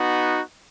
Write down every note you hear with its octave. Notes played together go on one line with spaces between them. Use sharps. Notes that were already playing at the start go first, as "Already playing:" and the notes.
Already playing: B3 D#4 F#4